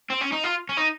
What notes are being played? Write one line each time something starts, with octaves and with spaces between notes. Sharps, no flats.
C4
C#4
D#4
F4
C#4
D#4